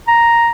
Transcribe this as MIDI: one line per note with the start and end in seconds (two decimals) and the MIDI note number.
0.08 0.51 82